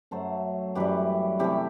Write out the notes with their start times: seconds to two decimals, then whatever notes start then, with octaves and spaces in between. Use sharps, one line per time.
0.11 F#2 F#3 A3 A4 C5
0.75 F#2 E3 G3 G4 B4
1.39 C3 E3 A3 E4 G4